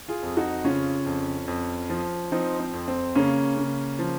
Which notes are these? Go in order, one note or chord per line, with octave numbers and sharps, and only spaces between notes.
F4 G#4
F2
D#4 F#4
C#3 C#4 F4
F2
F2
F3
F3 C4 D#4
C4
F2
C4
C#3 A#3 C#4
C#3
F3